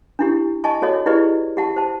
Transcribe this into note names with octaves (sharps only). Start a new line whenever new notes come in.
D4 E4 G4
D#5 G#5 A5 C#6
F#4 A4 C#5 D#5
E4 G4 G#4 B4 D5 D#5
G4 F#5 A5
C5 A5